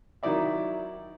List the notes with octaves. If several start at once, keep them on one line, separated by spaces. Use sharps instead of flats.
D#3 F#3 D#4 E4 D5 E5